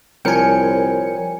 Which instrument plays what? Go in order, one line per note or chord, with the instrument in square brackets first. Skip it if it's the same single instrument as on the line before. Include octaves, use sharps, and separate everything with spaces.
[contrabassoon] C2 [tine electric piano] F3 A#4 G5 [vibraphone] C#5 [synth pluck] G#5 C#7